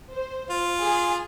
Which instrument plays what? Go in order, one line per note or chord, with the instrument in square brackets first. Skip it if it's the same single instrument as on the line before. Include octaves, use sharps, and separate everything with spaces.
[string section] C5
[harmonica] F4
[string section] G#4